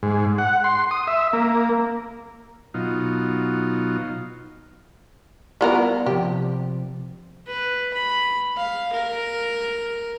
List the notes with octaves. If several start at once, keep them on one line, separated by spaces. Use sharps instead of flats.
G#2
F#5
C6
D#6
E5
A#3
B2 F#3 D#4 F4
G3 B3 E4 F4 A#4 B5
C3 F3 G4
B4
B5
F5
A#4